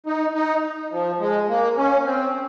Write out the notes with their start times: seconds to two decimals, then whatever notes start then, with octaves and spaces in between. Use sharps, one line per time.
0.06 D#4
0.35 D#4
0.92 F3
1.20 G#3
1.49 A#3
1.77 C#4
2.05 C4